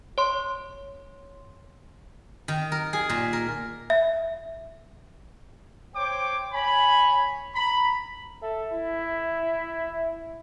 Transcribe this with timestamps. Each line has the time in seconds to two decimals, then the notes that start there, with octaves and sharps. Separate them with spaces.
0.18 C#5 C6
2.48 D#3
2.72 A#4
2.93 G#4
3.09 A#2
3.33 A#4
3.90 E5
5.95 C5 C#5 G5 D6
6.53 C#5 G#5 B5
7.54 A#5 B5
8.42 A4 E5
8.72 E4